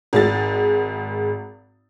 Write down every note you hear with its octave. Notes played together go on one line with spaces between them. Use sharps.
G#1 G#3 A6